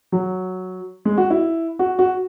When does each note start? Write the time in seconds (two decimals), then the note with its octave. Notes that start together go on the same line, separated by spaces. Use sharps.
0.12 F#3
1.05 G#3
1.18 F#4
1.30 E4
1.79 F#4
1.99 F#4